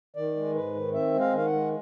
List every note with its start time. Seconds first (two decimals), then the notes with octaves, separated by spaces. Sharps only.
0.16 D#3 D5
0.36 G#3
0.55 G#2 B4
0.74 D#3
0.94 C4 E5
1.14 G#3
1.20 F5
1.33 D#3 F5
1.45 F#5
1.53 G#3